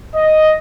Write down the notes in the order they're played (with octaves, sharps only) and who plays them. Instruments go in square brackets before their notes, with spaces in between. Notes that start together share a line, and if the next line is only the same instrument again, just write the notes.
[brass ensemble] D#5